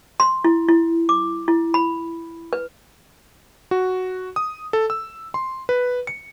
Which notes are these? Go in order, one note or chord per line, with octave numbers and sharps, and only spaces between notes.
C6
E4
E4
D6
E4
B5
B4
F#4
D#6
A4
E6
C6
B4
C#7